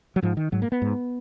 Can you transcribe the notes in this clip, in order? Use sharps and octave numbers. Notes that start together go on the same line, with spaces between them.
F#3
G#2 F3
D#3
G#2 F#3
A#3
B3
G#2